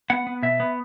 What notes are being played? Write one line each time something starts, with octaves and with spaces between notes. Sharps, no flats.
B3 F#5
B3
B2 E5
B3